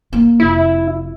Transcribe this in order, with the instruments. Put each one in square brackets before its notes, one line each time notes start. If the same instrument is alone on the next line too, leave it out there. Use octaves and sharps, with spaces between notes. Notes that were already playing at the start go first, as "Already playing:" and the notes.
[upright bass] A#3
[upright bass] F1 [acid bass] E4